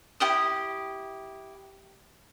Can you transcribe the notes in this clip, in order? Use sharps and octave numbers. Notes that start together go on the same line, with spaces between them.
E4 G4 G5 D#6